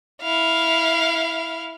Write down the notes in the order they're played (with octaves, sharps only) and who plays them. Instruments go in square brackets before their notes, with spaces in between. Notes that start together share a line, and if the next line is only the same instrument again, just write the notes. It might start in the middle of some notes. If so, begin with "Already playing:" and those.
[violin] E4 F5